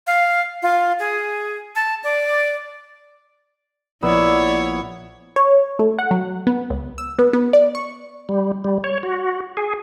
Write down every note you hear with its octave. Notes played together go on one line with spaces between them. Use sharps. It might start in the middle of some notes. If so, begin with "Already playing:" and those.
F5
F4
G#4
A5
D5
A#1 B3 E4 C#5 D5 E6
C#5
A3
F#5
F#3
B3
C#2
E6
B3
B3
D5
C#6
G3
G3
C#5
F#4
G#4